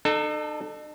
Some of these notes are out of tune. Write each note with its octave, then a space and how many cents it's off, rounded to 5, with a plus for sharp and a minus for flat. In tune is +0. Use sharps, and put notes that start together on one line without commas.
D#4 -45 A4 +0